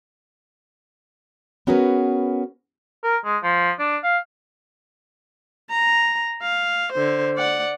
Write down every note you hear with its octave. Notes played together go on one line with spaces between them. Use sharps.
B3 C#4 F#4 G#4 A#4 B4
A#4
G#3
F3
D4
F5
A#5
F5
D3 C5
D5 F#5